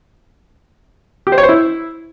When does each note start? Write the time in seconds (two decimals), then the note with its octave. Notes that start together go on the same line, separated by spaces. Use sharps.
1.27 G4
1.32 C5
1.38 C#5
1.43 C5
1.49 E4